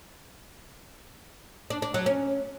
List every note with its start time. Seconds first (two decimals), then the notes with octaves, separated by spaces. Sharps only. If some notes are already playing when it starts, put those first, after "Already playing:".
1.70 D4
1.82 D4
1.94 F#3
2.06 C#4